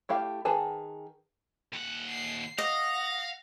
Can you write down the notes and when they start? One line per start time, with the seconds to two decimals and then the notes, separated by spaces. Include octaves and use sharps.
0.09 A3 E4 G4 F5
0.45 D#3 G#4 B4 A5
1.73 D#2 F#5
2.09 C7
2.58 D#5 F5 F#5 A#6